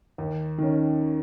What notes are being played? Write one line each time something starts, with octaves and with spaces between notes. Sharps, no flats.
D#2
D#3 C#4